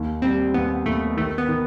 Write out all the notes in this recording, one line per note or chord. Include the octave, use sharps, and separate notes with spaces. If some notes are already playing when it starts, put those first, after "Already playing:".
Already playing: D#2
G3 C4
D#2 B3
D#2 A3
D#3 A3
B3
D#3